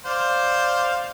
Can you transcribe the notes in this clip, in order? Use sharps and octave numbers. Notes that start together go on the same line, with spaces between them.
C5 D5 F5